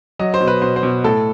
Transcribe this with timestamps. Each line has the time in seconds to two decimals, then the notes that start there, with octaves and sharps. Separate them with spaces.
0.19 F#3 D#5
0.34 C5
0.41 B2
0.47 B4
0.62 B2 C5
0.76 C5
0.83 B2
1.04 A2 A4